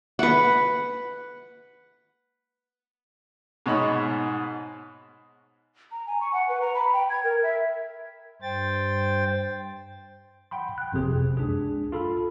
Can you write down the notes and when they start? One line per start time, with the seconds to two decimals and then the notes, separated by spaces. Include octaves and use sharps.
0.19 B4 F#5
3.66 G#2 B2 C#5 D#5 B5
5.92 A#5
6.07 G#5
6.21 C#6
6.33 F#5
6.49 B4
6.61 A#5
6.75 B5
6.93 G5
7.10 G#6
7.24 A#4
7.43 E5
8.42 G2 C5 G5 A6
10.51 F#5 G5 B5 C6
10.78 G5 F#6
10.92 G1 F2 C3 G#4
11.13 F#2
11.37 C#2 D4 G#4
11.92 F4 A4 B5